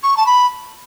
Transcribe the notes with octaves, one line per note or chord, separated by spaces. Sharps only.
C#6
A5
B5